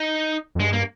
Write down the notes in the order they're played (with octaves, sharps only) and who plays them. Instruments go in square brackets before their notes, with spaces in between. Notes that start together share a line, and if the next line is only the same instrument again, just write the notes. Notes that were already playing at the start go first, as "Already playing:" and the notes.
Already playing: [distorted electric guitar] D#4
[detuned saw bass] F2
[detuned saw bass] G2 [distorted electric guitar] G#3
[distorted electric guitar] A#3